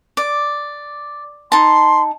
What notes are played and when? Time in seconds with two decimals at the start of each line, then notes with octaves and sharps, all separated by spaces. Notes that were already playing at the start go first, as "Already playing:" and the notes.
0.17 D5
1.52 D#4 A5 C6